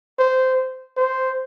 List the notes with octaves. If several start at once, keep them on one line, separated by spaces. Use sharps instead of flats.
C5
C5